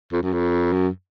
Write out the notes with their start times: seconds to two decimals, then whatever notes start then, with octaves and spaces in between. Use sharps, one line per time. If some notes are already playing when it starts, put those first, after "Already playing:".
0.13 F2
0.23 F#2
0.33 F2
0.73 F#2